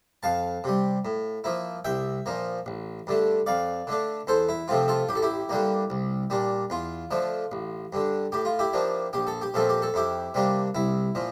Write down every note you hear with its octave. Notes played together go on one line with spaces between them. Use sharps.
F2 F5 A5
C3 G3
A2
F3 A#3 E4
C2 E5 G5
A#2 F3 A#3
A1
G2 D3 A3
F2 D5 F5
D3 A3 D4
E2 A4 C5
E4
C3 F3 A3 C4 F4
F4 A4
A1 G4
A4
E4 G4
G2 D3 G3 A#3
C2
A#2 G3 D4
E2 F4
D3 F3 A3
A1
G2 D3
A2 G4
F4
E4 G4
F3 A#3 D4
A#1 G4
A4
G4
A#2 F3 A3 C4 A4
G4
A4
F2 E4 G4
C3 G3 A#3 D4
C2 E4
A#2 F3